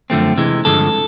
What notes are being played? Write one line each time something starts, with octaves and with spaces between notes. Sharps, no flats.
F#2 D3 F3 A3 C4
C3 E3 G#3
G2 D3 F3 G#3 A4